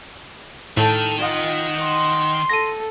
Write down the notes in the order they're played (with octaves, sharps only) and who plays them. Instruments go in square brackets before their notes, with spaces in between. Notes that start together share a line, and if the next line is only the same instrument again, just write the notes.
[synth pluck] A2 [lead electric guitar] D#3 [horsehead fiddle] A4 A5
[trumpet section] F4 [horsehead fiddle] D#5 F#5
[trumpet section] C6
[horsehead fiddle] A4 [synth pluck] A#6 D#7